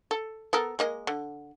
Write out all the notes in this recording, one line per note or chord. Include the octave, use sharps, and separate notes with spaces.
A4
B3 A4 A#4
G#3 A#3 D#5
D3